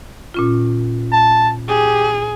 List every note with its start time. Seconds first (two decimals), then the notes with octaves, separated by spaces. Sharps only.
0.34 A#2 C#4 F4
1.12 A5
1.69 G4 G#4